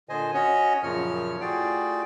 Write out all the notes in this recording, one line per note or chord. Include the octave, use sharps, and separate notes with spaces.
A#2 D3 C5 D#5 G#5
C#4 F#4 C#5 D#5
F#2 A#2 C#3 F3 C#5 F6
A2 F4 F#4 G#4 D5 G5